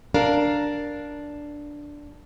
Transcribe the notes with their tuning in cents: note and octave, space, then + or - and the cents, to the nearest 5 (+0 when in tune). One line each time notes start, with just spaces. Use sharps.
D4 +0 A#4 +0 F5 +0